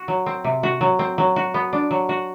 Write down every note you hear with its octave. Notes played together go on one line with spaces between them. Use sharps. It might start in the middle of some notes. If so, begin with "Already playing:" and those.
Already playing: F#4
F#3
C4
C3
F#4
F#3
C4
F#3
F#4
B3
D4
F#3
F#4